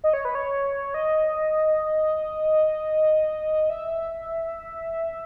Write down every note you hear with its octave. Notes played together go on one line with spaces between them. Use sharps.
D#5
C#5
B4
C#5
D#5
E5